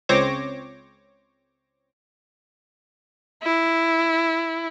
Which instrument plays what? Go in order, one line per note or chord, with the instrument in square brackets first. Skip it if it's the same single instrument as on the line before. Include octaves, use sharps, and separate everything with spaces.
[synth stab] C#2 C4 C5 C#5 D6 A#6
[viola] E4